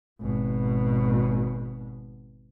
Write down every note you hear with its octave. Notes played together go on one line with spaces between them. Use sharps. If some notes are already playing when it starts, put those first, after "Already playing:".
G#1 B2